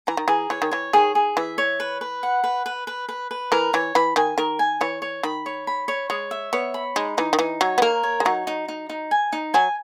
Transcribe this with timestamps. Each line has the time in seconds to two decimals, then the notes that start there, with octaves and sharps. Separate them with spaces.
0.07 E3 A#5
0.17 D#3
0.28 E3 G#4
0.50 E3 C#5
0.62 D#3
0.71 E3 C#5
0.93 D#3 G#4
1.15 G#4
1.37 E3 E5
1.58 C#5
1.80 B4
2.01 B4
2.23 F#5
2.44 B4
2.66 B4
2.87 B4
3.09 B4
3.31 B4
3.52 E3 A#4
3.73 E3 C#5
3.95 E3 B5
4.16 D#3 G#5
4.38 D#3 A#4
4.59 G#5
4.81 E3 C#5
5.02 C#5
5.23 D#3 B5
5.46 C#5
5.67 B5
5.88 C#5
6.10 G#3 C#5
6.31 E5
6.53 B3 C#5
6.74 B5
6.96 G#3 D#4
7.18 E3 D#4
7.33 D#3
7.39 E3 D#4
7.61 F#3 C#5
7.78 B3
7.82 A#3 A#4
8.03 C#5
8.20 G#3
8.25 F#3 D#4
8.47 D#4
8.68 D#4
8.90 D#4
9.11 G#5
9.33 D#4
9.54 F#3 G#5